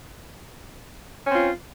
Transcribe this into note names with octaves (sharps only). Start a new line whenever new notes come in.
C4 C#4 F4